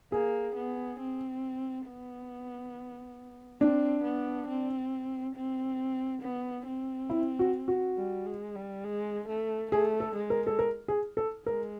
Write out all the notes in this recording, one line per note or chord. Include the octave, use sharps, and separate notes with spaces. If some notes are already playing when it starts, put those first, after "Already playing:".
A#3 G#4
B3
C4
B3
C4 D4
B3
C4
C4
B3
C4
E4
F#4
F#4
G3
G#3
G3
G#3
A3
A3 G#4
A4
G#3
A#4
A4
A#4
G#4
A4
G#3 A#4